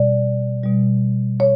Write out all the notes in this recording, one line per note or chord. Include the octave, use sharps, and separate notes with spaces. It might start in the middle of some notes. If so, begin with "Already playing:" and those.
Already playing: B2 G3 D5
B2 G3
C#5